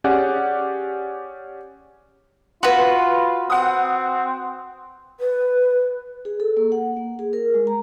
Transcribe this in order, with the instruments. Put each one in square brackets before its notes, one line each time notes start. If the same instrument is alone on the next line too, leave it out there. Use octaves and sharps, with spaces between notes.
[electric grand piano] C#4 G4 G#4 D5 F#5
[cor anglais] F4 [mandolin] F#4 B4 [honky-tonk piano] C6
[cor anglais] C4 [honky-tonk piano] F#5 D#6
[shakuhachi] B4
[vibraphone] G#4
A4
A#3
F#5
A#3
G#4
A#4
G#3
A#5